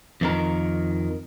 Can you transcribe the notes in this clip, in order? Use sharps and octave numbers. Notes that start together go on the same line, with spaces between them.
F2 D#3 A#4